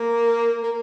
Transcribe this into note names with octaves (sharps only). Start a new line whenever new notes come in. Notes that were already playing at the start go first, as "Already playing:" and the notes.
Already playing: A#3
A#3